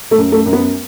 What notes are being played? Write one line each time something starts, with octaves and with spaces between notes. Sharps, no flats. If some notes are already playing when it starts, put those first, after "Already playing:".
A3
F#2
A3
F#2
B3